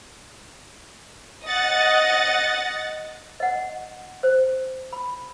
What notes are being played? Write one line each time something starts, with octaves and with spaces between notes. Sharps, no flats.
D#5 F#5 A6
D#5 F#5
C5
B5